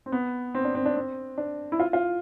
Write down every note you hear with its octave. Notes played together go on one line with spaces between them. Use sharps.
C4
B3
C4
D4
C4
D4
C4
D4
E4
F4
F4